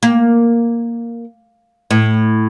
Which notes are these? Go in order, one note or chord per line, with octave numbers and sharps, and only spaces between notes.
A#3
A2